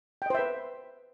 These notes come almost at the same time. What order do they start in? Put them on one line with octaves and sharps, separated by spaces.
G5 D#5 C5 E5 B4